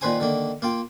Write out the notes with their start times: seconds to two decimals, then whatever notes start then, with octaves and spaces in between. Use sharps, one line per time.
0.01 A#2 D#3 B4 C5 G#5 D#6
0.20 D3 D#3 A#3
0.62 A#3 F4 G5